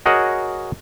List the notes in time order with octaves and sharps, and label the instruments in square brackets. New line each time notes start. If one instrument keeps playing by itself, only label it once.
[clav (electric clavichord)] F#4 G#4 A#4 C#5 D#5 F#5